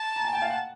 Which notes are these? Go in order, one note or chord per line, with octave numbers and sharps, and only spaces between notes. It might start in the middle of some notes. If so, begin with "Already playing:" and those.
Already playing: A5
A#5
G#5
G5
F5
F#5